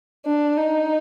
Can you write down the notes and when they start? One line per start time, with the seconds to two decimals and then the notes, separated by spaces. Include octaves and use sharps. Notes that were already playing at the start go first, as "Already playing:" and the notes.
0.25 D4
0.57 D#4